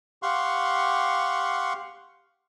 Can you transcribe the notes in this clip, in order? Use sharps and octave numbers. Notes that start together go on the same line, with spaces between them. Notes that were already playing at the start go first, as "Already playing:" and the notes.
G4 F5 F#5 C6 C#6